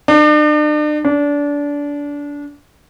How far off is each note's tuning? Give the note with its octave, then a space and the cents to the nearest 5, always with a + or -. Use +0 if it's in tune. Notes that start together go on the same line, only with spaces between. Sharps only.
D4 +40
D4 -25